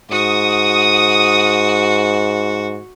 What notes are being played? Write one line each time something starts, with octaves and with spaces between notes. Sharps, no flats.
G#2 F#4 D#6